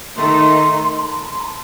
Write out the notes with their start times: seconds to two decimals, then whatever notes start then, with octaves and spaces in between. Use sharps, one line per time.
0.16 D#3 A3 D#4 C6
0.99 A5
1.09 C6
1.20 A5
1.30 C6
1.41 A5